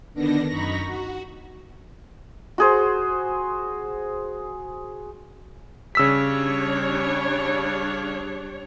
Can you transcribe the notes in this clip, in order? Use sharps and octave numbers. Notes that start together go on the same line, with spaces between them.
D3 D#3 B3 D4 A#6
F#2 D#4 A#5 B5 C#6 A#6
F#4
F#4 G#4 C5
C#3 G3 D4 C#5 E6 B6